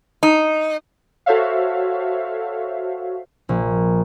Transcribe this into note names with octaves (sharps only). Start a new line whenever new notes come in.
D#4
F#4 A4 C5 C#5 E5 F5
A#1